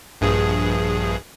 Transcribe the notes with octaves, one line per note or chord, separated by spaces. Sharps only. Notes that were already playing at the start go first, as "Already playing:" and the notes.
A#1 G2 G#4